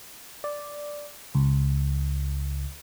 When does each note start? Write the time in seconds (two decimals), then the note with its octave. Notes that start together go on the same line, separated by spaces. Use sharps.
0.44 D5
1.35 C#2